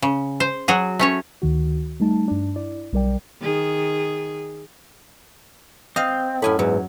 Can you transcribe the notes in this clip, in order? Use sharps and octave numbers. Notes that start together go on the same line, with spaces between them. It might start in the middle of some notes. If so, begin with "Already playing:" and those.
C#3
C5
F#3 F#4 G#4
A3 C#4 C#5
D2 D#3 F#4
G3 A3 D#4 A5
G2 D4
E4 D5
B1 G3 A#4 D5 G5
D#3 G#4
C4 D#5 F5
F#2 A2 G#5 B5
E2 G#2 F#3